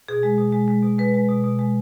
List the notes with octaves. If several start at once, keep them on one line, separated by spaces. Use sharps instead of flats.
B2 G#4
G#3
B2
G#3
G#3
B2
G#3 B4
G#3
B2
B2
G#3